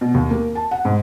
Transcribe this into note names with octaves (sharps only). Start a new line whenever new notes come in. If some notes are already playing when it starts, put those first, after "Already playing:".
B2
D#2
A#3
A5
F#5
G#2